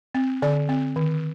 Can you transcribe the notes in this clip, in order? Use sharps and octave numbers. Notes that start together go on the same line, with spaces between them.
C4
D3 D5
C4
D#3